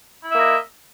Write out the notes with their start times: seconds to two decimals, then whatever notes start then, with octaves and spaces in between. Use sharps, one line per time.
0.24 E4
0.28 E5
0.33 A#3
0.37 D#5